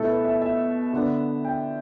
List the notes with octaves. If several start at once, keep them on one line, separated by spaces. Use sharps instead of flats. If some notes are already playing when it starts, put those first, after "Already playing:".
Already playing: B2 A3 E4 A4
B4
E5
E5
D3 B3 D4
G5